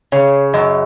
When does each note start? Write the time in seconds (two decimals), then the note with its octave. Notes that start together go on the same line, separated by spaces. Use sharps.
0.12 C#3 C#5
0.54 F#2 D#5